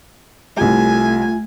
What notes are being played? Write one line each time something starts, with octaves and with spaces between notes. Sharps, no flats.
C2 G3 A3 F4 G#5